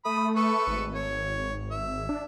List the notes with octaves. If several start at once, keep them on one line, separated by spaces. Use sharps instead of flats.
A3 B5 D#6
A4 B4 C#6
G#1
C#5
E5
D4